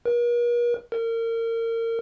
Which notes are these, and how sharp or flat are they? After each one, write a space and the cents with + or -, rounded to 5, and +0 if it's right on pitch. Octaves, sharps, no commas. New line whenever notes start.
A#4 +45
A#4 -30